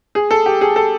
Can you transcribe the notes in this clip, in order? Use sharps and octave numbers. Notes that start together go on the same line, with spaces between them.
G#4
A4
G4
G#4
A4